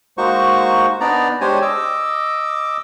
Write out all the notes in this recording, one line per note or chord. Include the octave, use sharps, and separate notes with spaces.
G#3 A#3 D#4 F#4 C5 C#6
B3 D4 D#4 D5 A#5
G#3 D4 G4 C5 C#5 G#5
D#5 D6 E6